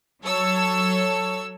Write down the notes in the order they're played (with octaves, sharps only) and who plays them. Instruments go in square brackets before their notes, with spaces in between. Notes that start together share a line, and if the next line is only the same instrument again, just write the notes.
[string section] F#3 A4 C#5 E6